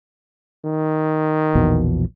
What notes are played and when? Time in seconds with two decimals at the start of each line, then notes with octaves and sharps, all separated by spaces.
0.65 D#3
1.55 A#1 E2 B2